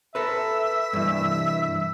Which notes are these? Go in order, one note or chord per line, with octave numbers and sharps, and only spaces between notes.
A4 B4 E5
G2 E3